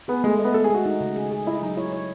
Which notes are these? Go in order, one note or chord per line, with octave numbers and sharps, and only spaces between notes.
B3 G#4
G#3 A3
D#5
B3
G#3 A4
G#4
G#3 F#4
D#4
C#3
G#4
G#4
E4 D#5
F#3 D#4
E4 C#5
C#5